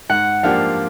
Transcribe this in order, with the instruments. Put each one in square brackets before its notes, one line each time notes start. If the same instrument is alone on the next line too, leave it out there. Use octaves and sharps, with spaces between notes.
[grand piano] G#2 [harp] F#5
[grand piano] F3 A#3 D4 G4 [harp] F5